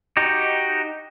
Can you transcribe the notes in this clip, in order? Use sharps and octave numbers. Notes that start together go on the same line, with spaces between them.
D#4 F#4 G4